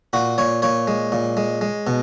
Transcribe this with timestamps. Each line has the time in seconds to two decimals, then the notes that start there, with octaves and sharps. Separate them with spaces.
0.13 A#2 F#4
0.38 A#2 C#5
0.62 A#2 C#5
0.88 G#3
1.12 A#2
1.37 G#3
1.61 G#3
1.87 B2